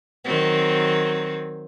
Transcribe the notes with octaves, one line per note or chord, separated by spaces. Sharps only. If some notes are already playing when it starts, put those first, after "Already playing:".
D#3 F#3 C4